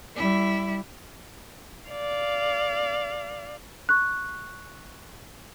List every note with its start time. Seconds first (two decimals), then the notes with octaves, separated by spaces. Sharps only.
0.16 G3 E4
1.89 D5 F5
3.89 C#6 F#6